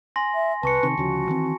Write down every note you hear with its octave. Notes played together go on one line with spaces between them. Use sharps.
G#5 C6 A#6
E5
C2 B4 A5 C#6 C#7
C3 D#3 C#6
D2 C#3 F3 F#4
D#3 E3 C4